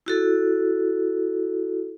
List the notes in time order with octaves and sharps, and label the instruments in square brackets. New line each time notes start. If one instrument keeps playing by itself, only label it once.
[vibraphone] E4 F#4 A4